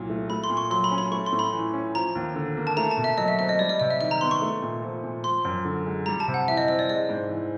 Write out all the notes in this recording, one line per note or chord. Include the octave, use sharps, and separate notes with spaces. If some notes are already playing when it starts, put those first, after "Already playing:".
Already playing: C2 A#2 F#3
A3
A3 B5
C6
A#2
C#6
F#3 C6
B5
C#4
B5
A3 C#6
C6
A2
B5
E3
C#4
F3 A#5
D#2
D3
A#3
A5
A3 A#5
A5
B2
E5
F#3 D#5
E5
C4 E5
D#5
G3 D5
D#5
C3 D#5
E5
D#3 E5
A#5
B3 C6
C#6
A3
A#2
F3
A#2
F3 C6
F#2
D3
G#3
G3 A#5
A5
C3
F#5
E3 E5
D#5
C4 D#5
D5
G#3 D#5
G#2
E3